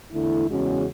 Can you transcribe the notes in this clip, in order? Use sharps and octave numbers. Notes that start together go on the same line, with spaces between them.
E2 D3 A3 E4
E2 C#3 G#3 C#4 F#4